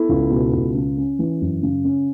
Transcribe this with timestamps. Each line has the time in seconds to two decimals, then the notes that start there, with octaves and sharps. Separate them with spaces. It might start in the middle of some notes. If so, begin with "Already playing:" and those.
Already playing: B3 E4 A4
0.09 C#2
0.31 B2
0.53 C#2
0.74 C#3
0.97 C#4
1.19 E3
1.41 F#2
1.63 C#3
1.85 C#4